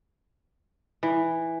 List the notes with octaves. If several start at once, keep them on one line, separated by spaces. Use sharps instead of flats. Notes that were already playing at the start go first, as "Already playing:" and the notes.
E3